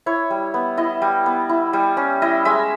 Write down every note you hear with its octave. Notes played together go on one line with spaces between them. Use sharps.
E4 C#5
G3
B3
E4 D#5
G3
B3
E4
G3
C#4
E4 D#5
G#3 E5